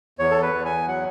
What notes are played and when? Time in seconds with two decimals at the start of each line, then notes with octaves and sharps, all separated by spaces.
0.19 E2 C#5
0.31 A4
0.42 B4
0.54 E2
0.65 G#5
0.87 F#3 F#5